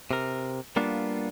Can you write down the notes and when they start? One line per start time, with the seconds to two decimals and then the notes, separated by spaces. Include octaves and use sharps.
0.11 C3 A#4
0.76 G3 A#3 B3 D4 F4